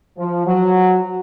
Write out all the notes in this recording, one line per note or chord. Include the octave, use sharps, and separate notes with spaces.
F3
F#3